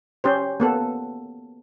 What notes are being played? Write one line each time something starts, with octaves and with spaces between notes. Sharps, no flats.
C#4 G4 C5
A#3 B3 A4